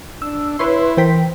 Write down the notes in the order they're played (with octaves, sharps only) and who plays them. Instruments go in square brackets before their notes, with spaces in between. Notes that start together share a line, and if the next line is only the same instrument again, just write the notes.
[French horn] D4 [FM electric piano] E6
[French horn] E4 [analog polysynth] B4 C#5 C6
[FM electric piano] E3 A#4 B6 [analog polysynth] C5 G5